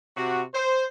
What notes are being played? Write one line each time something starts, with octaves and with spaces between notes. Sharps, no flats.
C3 F#4
C5